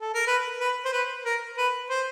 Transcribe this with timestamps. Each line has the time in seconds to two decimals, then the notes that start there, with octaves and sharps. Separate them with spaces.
0.01 A4
0.14 A#4
0.27 B4
0.60 B4
0.85 C5
0.93 B4
1.25 A#4
1.57 B4
1.90 C5